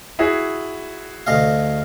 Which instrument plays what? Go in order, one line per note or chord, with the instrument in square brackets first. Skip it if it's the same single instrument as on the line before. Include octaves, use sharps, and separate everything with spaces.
[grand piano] E4 F#4 G#4
[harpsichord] D2 D#5 F5